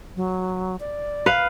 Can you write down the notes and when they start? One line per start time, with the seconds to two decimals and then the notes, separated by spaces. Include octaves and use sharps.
0.16 F#3
0.80 D5
1.26 B4 F5